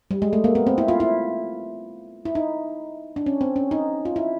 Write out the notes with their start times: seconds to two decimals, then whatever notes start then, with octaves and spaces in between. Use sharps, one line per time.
0.11 G3
0.22 G#3
0.33 A3
0.44 A#3
0.55 B3
0.67 C4
0.78 E4
0.88 F4
1.00 E4
2.25 E4
2.35 D#4
3.16 D4
3.26 C#4
3.41 C4
3.56 C#4
3.71 D#4
4.05 F4
4.16 E4